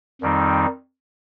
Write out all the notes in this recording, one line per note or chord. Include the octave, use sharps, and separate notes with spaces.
F2 D#3 G3 C4 D#4